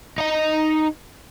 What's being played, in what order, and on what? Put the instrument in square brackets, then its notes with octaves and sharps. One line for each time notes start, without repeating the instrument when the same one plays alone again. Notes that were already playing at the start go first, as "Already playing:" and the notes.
[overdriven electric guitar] D#4 D#5